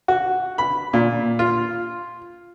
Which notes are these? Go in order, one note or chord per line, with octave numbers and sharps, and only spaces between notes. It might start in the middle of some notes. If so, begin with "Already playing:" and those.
F#4
B5
A#2
F4